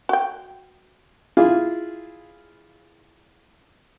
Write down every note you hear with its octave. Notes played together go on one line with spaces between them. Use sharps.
F#4 G5
E4 F4 G#4 F5